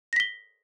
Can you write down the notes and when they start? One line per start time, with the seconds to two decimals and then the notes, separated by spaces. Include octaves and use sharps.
0.13 A#6
0.16 B6
0.20 G7